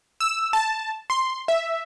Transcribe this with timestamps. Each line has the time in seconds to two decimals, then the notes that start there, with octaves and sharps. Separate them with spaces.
0.20 E6
0.53 A5
1.10 C6
1.48 E5